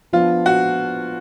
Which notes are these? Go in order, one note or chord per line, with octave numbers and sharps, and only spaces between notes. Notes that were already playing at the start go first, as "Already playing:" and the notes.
F3 B3 D4 F4
F#4